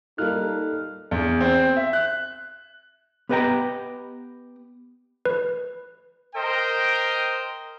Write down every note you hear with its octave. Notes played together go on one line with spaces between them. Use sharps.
G3 A#3 D#4 F4 A4 F6 F#6
E2
C4
E5
F#6
B3 G4 B4 D#5 G5 A#5
B4
A#4 C5 D#5 G5